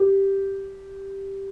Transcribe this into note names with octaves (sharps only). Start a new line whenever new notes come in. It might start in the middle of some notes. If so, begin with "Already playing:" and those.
Already playing: G4